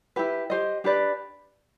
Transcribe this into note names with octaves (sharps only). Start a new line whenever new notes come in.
E4 G4 B4
G4 C5 D#5
D4 G4 B4 D5